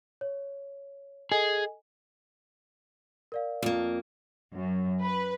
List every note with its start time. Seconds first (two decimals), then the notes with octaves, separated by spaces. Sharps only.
0.21 C#5
1.32 G#4 A4 D#5 G#5
3.32 A#4 D5 F5
3.62 F2 A#3
4.54 F#2
5.00 B4